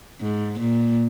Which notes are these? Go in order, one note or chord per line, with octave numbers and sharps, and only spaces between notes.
G#2
A#2